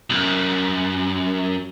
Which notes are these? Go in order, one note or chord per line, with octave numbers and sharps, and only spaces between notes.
C2 F#2